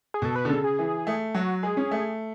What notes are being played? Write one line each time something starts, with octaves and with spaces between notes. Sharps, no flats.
G#4
B2 A4
B4
D3
C#3 A4
G#4
E3
A3
F#3 F#4
G#3 G#4
C#4
A3